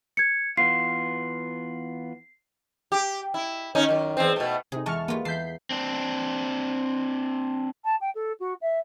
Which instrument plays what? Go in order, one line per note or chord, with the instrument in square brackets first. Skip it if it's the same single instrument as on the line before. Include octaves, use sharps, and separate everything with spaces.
[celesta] G#6 C#7
[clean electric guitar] E3 B3 F4 [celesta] C7
[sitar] G4
E4
D#3 C#4 D#4
F#2 D#3
E2 C4
B2 A3
[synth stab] C3 D#4 [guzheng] G#4
[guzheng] E2 G#3 [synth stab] A5 C#6 F6
[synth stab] G3 A#3 [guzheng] B3 F4
[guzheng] E2 A5 [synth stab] G6 B6 C7
[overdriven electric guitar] C4 D4
[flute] A5
G5
A4
F#4
E5